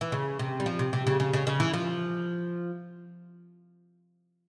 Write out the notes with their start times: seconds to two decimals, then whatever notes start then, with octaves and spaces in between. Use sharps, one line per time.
0.01 E3
0.12 C#3
0.39 C3
0.60 G3
0.66 F3
0.79 C3
0.93 C3
1.07 C#3
1.20 C#3
1.33 C#3
1.47 C#3
1.60 E3
1.73 F3